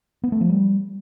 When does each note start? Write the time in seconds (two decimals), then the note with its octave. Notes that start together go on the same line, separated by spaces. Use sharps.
0.24 B3
0.32 A3
0.41 F3
0.49 G3